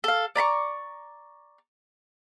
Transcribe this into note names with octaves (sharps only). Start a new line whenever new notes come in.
A4 F5
D5 A#5 B5 C#6